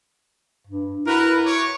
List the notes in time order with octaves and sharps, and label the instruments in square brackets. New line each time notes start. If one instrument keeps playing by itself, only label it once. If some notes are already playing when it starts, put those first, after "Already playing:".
[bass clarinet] G2
[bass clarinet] E4 [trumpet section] F#4 A#4 B4
[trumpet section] C#5 C#6 D6